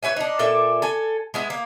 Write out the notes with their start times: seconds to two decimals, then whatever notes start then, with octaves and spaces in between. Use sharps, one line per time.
0.03 B4 C#5 E5 G#5
0.16 D4 D#4
0.39 A#2 A4 D5 E5
0.82 A4 G#5
1.34 G#3 B3 E4
1.50 A#3